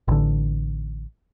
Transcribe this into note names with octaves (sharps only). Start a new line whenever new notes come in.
A1 D3